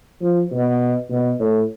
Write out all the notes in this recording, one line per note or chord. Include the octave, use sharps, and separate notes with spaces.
F3
B2
B2
A2